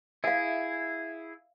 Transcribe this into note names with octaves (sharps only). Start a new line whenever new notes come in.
E4 G#4 E5 F5